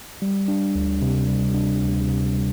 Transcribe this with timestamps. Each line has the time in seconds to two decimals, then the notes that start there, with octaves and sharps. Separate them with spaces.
0.22 G3
0.48 D4
0.75 D2
1.02 C3
1.28 G3
1.54 D4
1.81 D2
2.07 C3
2.34 G3